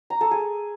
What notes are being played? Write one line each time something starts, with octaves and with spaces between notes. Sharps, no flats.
A#5
A4
G#4